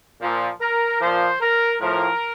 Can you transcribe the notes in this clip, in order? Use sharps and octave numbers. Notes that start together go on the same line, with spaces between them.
A#2 F3
A#4
A#2 F3 C5
A#4
A2 F3 A#4